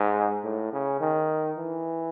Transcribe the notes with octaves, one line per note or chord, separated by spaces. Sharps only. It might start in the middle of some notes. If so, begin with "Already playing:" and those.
Already playing: G#2
A2
C#3
D#3
E3